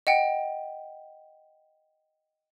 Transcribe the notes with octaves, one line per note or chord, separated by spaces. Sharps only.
D#5 F#5 G5